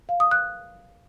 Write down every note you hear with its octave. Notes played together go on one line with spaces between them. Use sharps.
F5
D#6
F#6